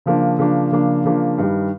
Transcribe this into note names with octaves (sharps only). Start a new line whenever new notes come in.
C#3 F3 A#3 D4
C#3 F3 A#3 D4
C#3 F3 A#3 D4
C#3 F3 A#3 D4
G2 D#3 G3